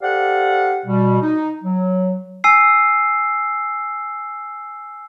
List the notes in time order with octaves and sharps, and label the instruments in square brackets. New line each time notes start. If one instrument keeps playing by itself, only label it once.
[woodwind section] G4 A4 C5 D5 F5 F#5
B2 G3
D#4
F#3
[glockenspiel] G#5 E6 C7